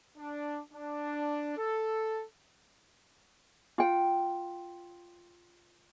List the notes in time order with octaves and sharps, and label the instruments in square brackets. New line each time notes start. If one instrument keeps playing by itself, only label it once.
[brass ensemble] D4
D4
A4
[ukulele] F4 G5